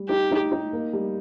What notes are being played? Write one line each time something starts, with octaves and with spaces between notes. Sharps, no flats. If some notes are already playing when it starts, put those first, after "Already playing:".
Already playing: G3
D#4 G4
D#4
D#4
A#3
G3